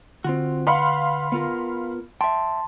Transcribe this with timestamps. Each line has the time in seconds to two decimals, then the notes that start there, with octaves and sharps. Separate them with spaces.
0.24 D3 C4 F4 F#4
0.67 B4 F5 F#5 B5 C6
1.32 B3 F4 A#4
2.21 E5 G5 A5 C6